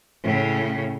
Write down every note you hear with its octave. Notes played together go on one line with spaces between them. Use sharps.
A2 C#3